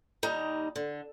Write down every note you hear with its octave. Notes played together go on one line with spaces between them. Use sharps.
D#2 G3 D#4 A#5
D3